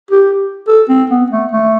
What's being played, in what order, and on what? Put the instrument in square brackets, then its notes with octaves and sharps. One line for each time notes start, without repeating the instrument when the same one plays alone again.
[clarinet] G4
A4
C4
B3
A3
A3